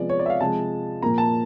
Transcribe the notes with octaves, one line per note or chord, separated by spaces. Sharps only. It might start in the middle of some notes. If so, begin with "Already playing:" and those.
Already playing: C3 F3 G#3 B3 D5
C#5
D5
E5
F5
C3 F3 G#3 A5
A#2 F3 A#3 A#5
A5